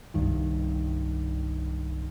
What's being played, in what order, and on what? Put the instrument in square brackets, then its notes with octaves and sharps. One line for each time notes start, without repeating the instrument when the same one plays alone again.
[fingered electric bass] C2 G2 D#3